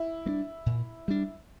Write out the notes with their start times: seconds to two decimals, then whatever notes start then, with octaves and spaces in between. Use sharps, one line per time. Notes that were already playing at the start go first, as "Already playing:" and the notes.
Already playing: E4
0.26 G3 A#3 D4
0.66 A#2
1.08 G3 D4